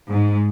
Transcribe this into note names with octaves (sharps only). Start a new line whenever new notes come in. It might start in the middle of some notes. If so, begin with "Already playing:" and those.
G#2